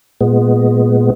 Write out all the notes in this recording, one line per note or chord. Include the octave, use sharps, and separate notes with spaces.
A#2 G#3 B3